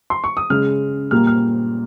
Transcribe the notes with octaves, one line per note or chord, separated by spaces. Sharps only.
C6
C#6
D#6
C#3 G#3 F6
A#2 G3 A#3 F6
F6